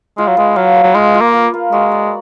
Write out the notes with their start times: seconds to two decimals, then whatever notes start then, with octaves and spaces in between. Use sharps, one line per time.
0.18 G#3 F4
0.28 F#3
0.37 G#3 B4
0.56 F#3 F5
0.76 B4
0.84 F#3
0.95 G#3 F4
1.14 F4
1.21 A#3
1.34 B4
1.54 A#3
1.72 G#3 F#4
1.92 D5